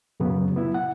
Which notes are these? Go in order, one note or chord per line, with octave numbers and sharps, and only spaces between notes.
F#2 A#2 C#3 F#3 B3
B3 E4
F#5